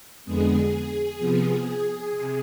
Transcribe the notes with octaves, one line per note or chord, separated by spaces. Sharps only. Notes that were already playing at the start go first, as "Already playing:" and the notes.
F2 D3 G#3 B3 G#4
C3 F3 B3
C3